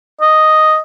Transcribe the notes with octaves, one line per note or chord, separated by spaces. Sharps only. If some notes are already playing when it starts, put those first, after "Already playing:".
D#5